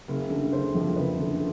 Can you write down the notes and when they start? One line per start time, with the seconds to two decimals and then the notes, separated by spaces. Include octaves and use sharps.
0.08 F#1
0.30 D3
0.52 F#1 C5
0.75 F2
0.96 F#1 B4
1.19 D3